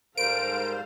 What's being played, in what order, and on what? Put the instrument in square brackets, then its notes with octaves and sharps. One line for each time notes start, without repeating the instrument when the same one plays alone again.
[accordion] G#2 G3 C5 [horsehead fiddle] A4 F5 [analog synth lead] A#4 [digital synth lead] D7